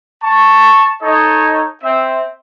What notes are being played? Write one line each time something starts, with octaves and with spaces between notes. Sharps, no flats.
A5 C#6
D#4 A4 C#5 D#5
C4 E5